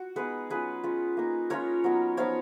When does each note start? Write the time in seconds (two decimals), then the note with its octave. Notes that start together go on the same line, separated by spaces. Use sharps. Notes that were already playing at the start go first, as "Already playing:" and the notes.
Already playing: F#4
0.16 G#3 B3 D#4 G#4 B4
0.50 F#3 C#4 F4 G#4 B4
0.83 G#3 C#4 F4
1.17 A#3 D#4
1.50 G#3 C#4 F4 A#4 C#5
1.84 F#3 B3 D#4
2.17 F3 B3 D#4 C#5 F5